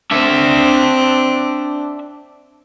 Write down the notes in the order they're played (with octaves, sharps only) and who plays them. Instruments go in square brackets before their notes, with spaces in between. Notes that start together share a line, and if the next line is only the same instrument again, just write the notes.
[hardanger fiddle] C4 [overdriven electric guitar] D4 E5